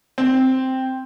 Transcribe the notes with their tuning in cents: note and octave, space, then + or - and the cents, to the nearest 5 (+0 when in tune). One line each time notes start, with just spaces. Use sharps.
C4 +0